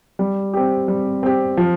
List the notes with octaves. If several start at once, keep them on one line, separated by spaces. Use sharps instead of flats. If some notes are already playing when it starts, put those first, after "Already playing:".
G3
C4 G4
G3
C4 G4
F3